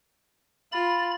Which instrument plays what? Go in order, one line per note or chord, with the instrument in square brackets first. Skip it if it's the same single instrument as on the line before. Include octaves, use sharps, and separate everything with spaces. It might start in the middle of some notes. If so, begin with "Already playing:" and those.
[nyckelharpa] F4 [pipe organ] B5 A6